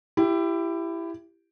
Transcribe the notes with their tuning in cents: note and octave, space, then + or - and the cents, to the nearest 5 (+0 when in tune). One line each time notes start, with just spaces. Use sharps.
E4 +20 G4 +0